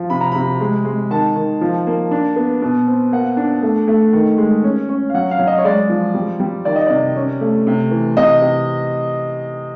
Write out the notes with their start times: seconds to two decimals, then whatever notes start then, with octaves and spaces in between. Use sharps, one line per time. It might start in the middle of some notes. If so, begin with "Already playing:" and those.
Already playing: F3
0.10 C3 B5
0.21 A#5
0.32 C3 B5
0.61 G#3
0.85 G#3
1.11 D#3 A5
1.35 D#3
1.61 F3
1.87 A#3
2.11 D4
2.36 B3
2.62 B2
2.87 C4
3.12 A#3 F#5
3.37 D4
3.62 A3
3.88 A3
4.13 D#3
4.38 G#3
4.64 C#4
4.89 C#4
5.10 F5
5.14 F#3 F#5
5.31 F5
5.39 F#3
5.47 D#5
5.58 C#5
5.65 G#3 D5
5.89 F3
6.14 G3
6.40 G3
6.65 D#3 D5
6.76 D#5
6.87 C3 D5
7.16 C#4
7.41 A3
7.67 C3
7.91 E3
8.17 C3 D#5
8.41 C3